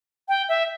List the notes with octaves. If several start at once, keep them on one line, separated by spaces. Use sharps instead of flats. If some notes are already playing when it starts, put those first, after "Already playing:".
G5
E5